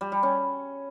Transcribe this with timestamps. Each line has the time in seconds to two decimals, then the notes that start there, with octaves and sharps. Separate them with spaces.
0.01 G3
0.12 G3
0.23 C#4